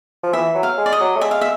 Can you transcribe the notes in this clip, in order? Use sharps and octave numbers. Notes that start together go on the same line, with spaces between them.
F3
E3 E5
F#3
F5
G#3
D5
D#5
F#3
A3
G#3 E5
F5
E5